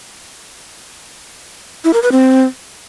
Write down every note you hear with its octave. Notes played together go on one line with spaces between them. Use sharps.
E4
A#4
B4
C4